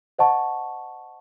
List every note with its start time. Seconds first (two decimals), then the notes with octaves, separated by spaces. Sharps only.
0.19 C5 D#5 F#5 A5 C#6